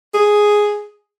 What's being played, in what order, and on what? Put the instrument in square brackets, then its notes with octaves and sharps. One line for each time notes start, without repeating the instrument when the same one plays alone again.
[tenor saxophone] G#4